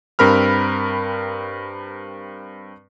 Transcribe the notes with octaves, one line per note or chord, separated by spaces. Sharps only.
G2 C4 A#4 B5 F6